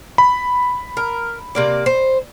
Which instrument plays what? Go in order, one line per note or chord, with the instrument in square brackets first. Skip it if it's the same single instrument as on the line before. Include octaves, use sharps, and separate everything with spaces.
[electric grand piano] B5
[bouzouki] A#4
C3 A#3 D5
C5